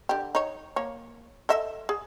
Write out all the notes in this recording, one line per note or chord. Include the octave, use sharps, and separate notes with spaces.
D3 G4
D#4 C#5
A#3 C#5
A4 D#5 E5
G#4